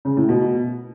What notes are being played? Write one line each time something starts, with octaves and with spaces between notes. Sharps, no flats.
C#3
A2
B2